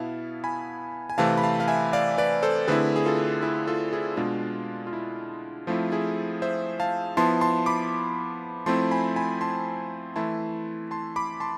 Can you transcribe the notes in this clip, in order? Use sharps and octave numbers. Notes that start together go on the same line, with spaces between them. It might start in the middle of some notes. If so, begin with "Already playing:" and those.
Already playing: B2 B3 E4 F5 A5
G#5 B5
G#5
C3 E3 A3 C4 F5 A5
B5
F5 A5
F5
E5 G#5
D5 F5
B4 D5
A4 C5
D3 A3 C4 E4 G#4 B4
G#4
F4 A4
E4 G#4
F4 A4
E4 G#4
B2 G#3 D4 F4
F4
E4
F3 A3 C4 E4 F4
E4 G#4
C5 E5
F5 A5
F3 B3 E4 A5 C6
A5 C6
B5 D6
F3 A3 C4 E4 A5 C6
G#5 B5
G#5 B5
A5 C6
E3 A3 E4 A5 C6
A5 C6
B5 D6
A5 C6